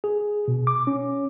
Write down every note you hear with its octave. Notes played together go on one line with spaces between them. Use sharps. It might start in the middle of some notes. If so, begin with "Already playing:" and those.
G#4
B2
D6
C#4